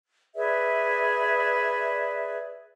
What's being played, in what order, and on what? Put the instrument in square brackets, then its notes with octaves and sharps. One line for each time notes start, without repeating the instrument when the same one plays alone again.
[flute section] G#4 B4 D5 E5